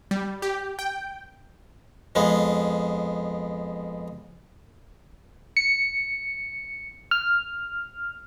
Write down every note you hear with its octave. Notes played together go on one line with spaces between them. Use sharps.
G3
G4
G5
F2 G#3 B3
C#7
F6